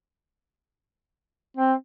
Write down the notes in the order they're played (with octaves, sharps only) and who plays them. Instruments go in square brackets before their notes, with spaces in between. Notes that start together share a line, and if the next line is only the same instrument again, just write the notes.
[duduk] C4